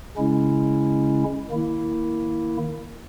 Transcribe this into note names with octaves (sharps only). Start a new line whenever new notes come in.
C#3 G#3 C#4 E4
D#3 A#3 E4